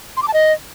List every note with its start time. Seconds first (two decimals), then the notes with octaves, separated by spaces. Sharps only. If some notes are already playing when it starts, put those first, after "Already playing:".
0.17 C6
0.22 D6
0.28 A5
0.34 D#5